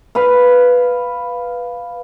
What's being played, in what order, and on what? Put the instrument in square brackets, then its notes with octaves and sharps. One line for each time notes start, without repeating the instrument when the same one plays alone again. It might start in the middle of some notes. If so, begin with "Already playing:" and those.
[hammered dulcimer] B4 F5